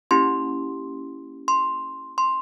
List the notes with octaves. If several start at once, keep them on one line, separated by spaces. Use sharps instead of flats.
A#3 C#4 E4 G4 C6
C6
C6